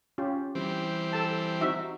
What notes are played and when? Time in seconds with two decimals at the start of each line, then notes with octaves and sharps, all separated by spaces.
0.18 C#4 F4 G4
0.55 E3 G3 C4
1.13 A4 A5
1.61 D#4 F#4 E5